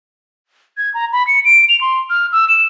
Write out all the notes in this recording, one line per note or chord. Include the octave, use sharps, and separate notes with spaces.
G#6
A#5
B5
C#7
D7
F7
C6
F6
E6
E7